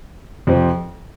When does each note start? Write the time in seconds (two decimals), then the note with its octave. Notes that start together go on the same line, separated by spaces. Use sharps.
0.47 F2 C3 F3 C4